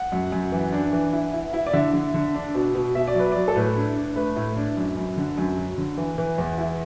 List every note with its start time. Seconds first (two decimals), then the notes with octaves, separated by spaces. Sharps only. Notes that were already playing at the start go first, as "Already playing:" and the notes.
Already playing: F#5
0.12 F#2
0.32 F#2
0.52 E3
0.72 D4
0.93 E3
1.13 E4
1.33 E4
1.53 E4
1.66 D5
1.73 D3 E5
1.93 D3
2.14 D3
2.34 D4
2.55 B2
2.75 B2
2.95 B2 E5
3.07 D5
3.15 F#3 B4
3.32 F#3 D5
3.48 A4
3.56 A2 B4
3.76 D4
3.96 D4
4.16 A3 B4
4.36 A2
4.56 D4
4.77 F#2
4.97 F#2
5.17 D3
5.38 F#2
5.58 F#3
5.78 D3
5.97 E3
6.18 E3
6.38 E2
6.58 E4